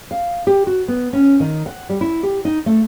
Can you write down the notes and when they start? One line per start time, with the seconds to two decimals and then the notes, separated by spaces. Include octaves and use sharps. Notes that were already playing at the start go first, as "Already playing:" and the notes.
0.11 F5
0.47 G4
0.67 F#4
0.88 B3
1.13 C#4
1.40 D#3
1.66 F#5
1.89 G3
2.01 E4
2.23 G4
2.45 D#4
2.66 A3